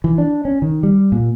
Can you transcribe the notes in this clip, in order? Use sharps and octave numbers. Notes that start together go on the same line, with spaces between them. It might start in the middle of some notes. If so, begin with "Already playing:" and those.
E3
D4
C#4
D#3
G3
A#2